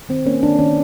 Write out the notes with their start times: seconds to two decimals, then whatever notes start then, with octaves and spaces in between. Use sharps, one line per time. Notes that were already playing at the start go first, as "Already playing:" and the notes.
0.09 D#3 C4
0.26 A#3 C#4
0.43 D#3 D4
0.59 D#3 C#4